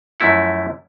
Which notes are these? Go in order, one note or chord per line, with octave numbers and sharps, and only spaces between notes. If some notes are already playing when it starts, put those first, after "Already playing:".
F#2 F3 A3 E4 F#5